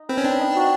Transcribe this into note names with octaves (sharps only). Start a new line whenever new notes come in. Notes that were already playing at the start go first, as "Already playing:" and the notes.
Already playing: D#4
C4 B4
C#4
C4 D4
D#4
F#4